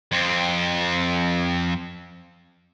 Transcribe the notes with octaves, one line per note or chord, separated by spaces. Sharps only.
F2 C4